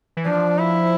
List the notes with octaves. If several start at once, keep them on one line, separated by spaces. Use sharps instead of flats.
E3
F3 D4
E4